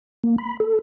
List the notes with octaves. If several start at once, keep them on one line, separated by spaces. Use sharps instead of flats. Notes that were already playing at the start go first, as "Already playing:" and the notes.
A#3
B5
A4